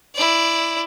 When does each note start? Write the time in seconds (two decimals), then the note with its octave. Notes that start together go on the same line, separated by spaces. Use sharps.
0.15 E4 D5